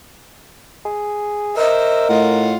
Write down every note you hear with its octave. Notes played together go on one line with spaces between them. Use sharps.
G#4
A#4 C5 D#5 E5
A2 F4 F#5 C6